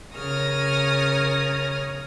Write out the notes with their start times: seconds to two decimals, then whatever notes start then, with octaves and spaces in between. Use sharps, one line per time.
0.15 C#3 A#4 C#5 D#6 F6